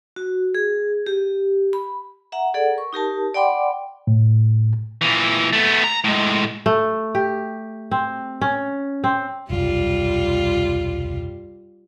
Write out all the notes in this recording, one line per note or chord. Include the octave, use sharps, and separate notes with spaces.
F#4
G#4
G4
B5
E5 F#5 A#5
G#4 A4 D5 F#5
A#4 C#6
D#4 G4 A#4 A5
D5 F#5 G5 B5 C6 D6
A2
A#2 E3
A3 B3
A#5
A2 G#3
A3
G4
C4
C#4
C4
E1 C2 F#2 G3 F4